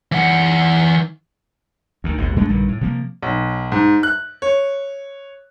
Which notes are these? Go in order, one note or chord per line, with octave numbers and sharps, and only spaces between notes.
E3 F#5
D2 D#3
G#1 D#2 B2
G2 G#3 A3 D4
A#1 G2 D3 D#3
A2
C3 F3 A#3
B1
G#2
F#6
C#5